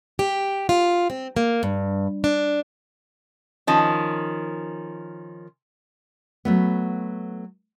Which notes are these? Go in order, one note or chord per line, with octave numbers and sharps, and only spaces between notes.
G4
F4
C4
A#3
G2
D4
D#3 F3 C#4
F#3 A3 B3